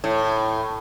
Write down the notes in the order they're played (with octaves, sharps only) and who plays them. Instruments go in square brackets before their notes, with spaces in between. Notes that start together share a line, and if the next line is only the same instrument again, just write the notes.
[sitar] A2